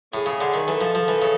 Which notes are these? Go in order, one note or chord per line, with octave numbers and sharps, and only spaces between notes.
A2 G#4
C#3
D3
D#3
E3 A4
F3
F3
E3
C#3